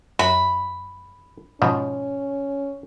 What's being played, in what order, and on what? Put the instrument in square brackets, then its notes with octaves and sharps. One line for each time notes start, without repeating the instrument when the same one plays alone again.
[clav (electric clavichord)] F#2 F#4 [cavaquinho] B5
[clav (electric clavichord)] G#2 B2 F3 [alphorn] C#4